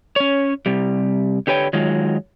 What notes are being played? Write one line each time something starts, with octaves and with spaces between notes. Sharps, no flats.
C#4 C#5
C3 G3
D3 G4 B4 C#5 G5
D#3 F#3 G#3 F4